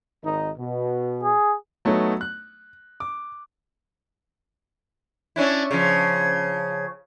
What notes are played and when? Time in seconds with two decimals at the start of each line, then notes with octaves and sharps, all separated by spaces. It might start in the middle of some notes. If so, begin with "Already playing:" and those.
0.24 G#1 D#3 D#4
0.57 B2
1.23 G#4
1.85 F#3 A3 B3 D#4 C#5
2.21 F#6
3.00 D6
5.36 C#4 D4 E4
5.71 C#3 F3